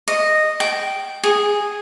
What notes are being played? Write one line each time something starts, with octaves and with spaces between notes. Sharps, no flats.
D#5
G5
G#4